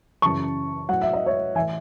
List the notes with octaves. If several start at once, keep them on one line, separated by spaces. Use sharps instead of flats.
F#2 C#3 E3 A5 C#6
A2 F#3 F#5
E5
D#5
C#5 E5
A2 E3 E5 G#5